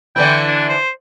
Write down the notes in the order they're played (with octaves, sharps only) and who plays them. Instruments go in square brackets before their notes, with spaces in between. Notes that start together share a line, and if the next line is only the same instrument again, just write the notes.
[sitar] D3 E3 E4 [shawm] G5
[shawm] D4
C5